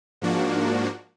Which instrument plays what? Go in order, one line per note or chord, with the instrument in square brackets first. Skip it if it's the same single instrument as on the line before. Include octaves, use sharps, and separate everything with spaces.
[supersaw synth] G#2 F3 A#3 D4 F#4